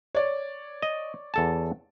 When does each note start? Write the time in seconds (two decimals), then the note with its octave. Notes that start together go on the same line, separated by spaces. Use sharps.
0.15 C#5 D5
0.82 D#5
1.34 E2 A4 A5